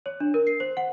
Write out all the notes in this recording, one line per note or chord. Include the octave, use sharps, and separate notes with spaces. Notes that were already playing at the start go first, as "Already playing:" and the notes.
C#5
D4
A#4
C7
C5
F#5